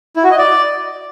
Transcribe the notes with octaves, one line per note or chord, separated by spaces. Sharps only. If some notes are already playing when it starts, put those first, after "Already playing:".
E4
F#4
D#5
D5